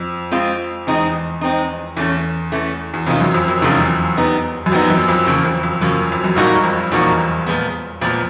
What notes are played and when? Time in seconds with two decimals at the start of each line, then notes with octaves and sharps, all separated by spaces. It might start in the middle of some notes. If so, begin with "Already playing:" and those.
Already playing: F2
0.31 G#3 C4 F4
0.87 E2 G#3 C4 D#4
1.41 G#3 C4 D#4
1.96 E2 E3 A3 C#4
2.52 E3 A3 C#4
2.94 E2
3.07 F2 C3 D#3 G#3 C#4 F4
3.20 F#2
3.34 F2
3.48 F2
3.61 E2 C3 D#3 G#3 C#4 F4
4.17 G3 B3 D#4
4.66 F#2
4.72 F2 G3 B3 D#4
4.90 F#2
5.09 F2
5.26 E2 C#3 F3 A#3
5.45 F2
5.63 F2
5.81 F#2 C#3 F3 A#3
6.12 F2
6.24 F#2
6.36 G2 A#2 F3 A#3 D#4 F#4
6.64 F2
6.92 E2 A#2 F3 A#3 D#4 F#4
7.46 A#2 F3 G#3 B3
8.01 F2 A#2 F3 G#3 B3